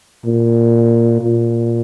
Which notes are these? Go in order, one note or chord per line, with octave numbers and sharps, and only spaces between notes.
A#2
A#2